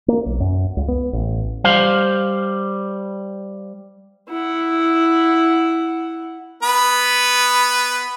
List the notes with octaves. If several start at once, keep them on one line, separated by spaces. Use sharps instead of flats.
A#3
B1
F#2
C#2
B3
A1
G3 C5 F5
E4 F#5
B3 B4